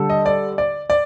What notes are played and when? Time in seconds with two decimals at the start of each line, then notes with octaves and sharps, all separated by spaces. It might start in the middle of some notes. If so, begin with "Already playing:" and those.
Already playing: D3 G3 D4 A4
0.10 D#5
0.26 D5
0.58 D5
0.90 D5